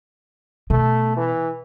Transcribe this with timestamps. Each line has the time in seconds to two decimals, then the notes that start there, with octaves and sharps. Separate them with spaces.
0.70 B2 A3
1.17 E3